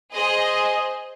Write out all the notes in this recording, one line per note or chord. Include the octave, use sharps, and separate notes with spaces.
G#4 C5 D#5